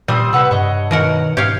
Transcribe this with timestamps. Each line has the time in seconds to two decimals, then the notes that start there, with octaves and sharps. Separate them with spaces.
0.08 A#2 G3 C4 C5 D#6
0.33 C3 B4 F#5 A5 E6
0.51 G2 C#5 D#5
0.91 B2 D#3 A#4 F#5
1.37 G#2 G4 C#5 F5